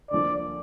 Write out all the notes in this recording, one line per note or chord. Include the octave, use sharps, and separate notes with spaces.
D2 D3 F3 A#3 D5